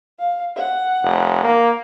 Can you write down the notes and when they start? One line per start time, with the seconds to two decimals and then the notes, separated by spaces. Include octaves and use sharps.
0.19 F5
0.56 F#5
1.04 F1
1.44 A#3